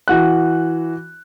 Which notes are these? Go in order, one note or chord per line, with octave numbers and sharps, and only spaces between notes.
E3 F#4 F#6